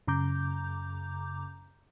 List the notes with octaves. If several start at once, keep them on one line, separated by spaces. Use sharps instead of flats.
F#2 C#3 A#5 D6 G6